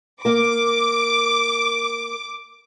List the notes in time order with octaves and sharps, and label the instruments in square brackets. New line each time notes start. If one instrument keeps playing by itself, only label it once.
[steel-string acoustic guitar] A#3 A#4 [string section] D6